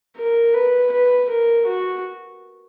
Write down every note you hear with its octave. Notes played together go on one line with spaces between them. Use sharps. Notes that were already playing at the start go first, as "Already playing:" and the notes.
A#4
B4
B4
A#4
F#4